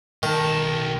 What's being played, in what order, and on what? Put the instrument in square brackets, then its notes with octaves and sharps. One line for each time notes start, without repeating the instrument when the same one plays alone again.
[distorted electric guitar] B1 A5 [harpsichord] D#3